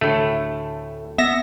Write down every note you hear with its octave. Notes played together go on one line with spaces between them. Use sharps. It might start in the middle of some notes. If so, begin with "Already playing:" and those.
D2 A2 A3
B3 E5 A#6